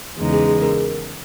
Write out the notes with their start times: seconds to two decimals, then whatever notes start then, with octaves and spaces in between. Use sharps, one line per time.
0.18 E2 C#3 G#3 D#4
0.33 G#4
0.48 G#4
0.62 A#4